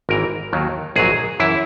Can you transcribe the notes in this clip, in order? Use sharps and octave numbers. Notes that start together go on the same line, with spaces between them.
G#1 G#2 E3 A#4
D#2 D#3 F#3
A#1 G#2 F#3 G#4
F#2 E3 E4